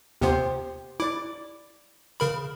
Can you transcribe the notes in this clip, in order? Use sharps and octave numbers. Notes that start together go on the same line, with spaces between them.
D#2 C3 B3 G4 C5
E4 D5 D6
C#3 A#4 B5